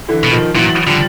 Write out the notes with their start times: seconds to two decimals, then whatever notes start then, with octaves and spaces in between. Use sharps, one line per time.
0.08 D3 E3
0.24 B2
0.31 D#3 F3
0.55 A#2 E3 F#3
0.86 D3 F3 G3